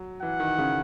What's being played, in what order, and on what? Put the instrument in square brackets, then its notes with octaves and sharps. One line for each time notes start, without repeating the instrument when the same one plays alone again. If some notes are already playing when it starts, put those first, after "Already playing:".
Already playing: [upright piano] F#3
[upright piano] E3 [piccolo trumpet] F#5
[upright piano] D#3
C#3